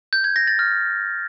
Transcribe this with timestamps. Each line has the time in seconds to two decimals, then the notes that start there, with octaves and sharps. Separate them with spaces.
0.13 G6
0.24 G#6
0.36 A#6
0.47 A6
0.59 F6